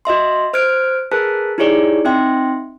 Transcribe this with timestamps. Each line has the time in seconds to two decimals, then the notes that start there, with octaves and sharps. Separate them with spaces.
0.05 F#4 D#5 E5 C6
0.53 C5 F6 G#6 D7
1.11 G#4 A#4 B4 A5 F#6 B6
1.58 D#4 E4 G4 G#4 C#5 D5
2.05 C4 D#4 E5 G5 C6